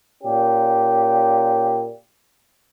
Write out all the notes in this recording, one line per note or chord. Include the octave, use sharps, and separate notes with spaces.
A#2 C#4 G4